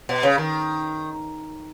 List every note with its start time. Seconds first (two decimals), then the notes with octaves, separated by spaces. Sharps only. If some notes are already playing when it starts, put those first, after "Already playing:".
0.09 B2
0.23 C#3
0.38 D#3